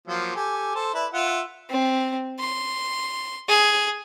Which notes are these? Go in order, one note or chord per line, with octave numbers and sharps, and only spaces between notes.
F3 F#3 A#3
G4 A4 G#5
A4 C5 A5
E4 B4 D5
F4 E5 F#5
C4
C6
G#4